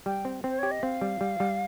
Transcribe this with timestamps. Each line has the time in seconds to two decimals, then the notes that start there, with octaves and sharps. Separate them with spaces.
0.06 G3 G5
0.25 C4
0.44 C4 C5
0.59 G4 C#5
0.71 D#5
0.83 C4 F5
1.02 G3
1.21 G3
1.40 G3